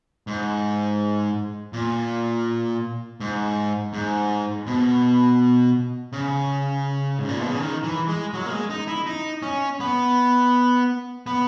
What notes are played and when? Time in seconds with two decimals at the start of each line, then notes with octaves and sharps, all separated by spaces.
0.27 G#2
1.73 A#2
3.20 G#2
3.93 G#2
4.67 B2
6.13 C#3
7.18 G#2
7.29 A#2
7.40 B2
7.49 C#3
7.59 D#3
7.84 E3
8.08 G#3
8.34 F#3
8.46 A#3
8.51 G#3
8.70 D#4
8.88 E4
9.06 D#4
9.43 C#4
9.80 B3
11.27 B3